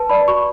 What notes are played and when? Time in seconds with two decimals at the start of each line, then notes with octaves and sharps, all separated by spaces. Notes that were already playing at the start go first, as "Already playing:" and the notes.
Already playing: B4 A5
0.09 D5 B5
0.28 F#4 C#6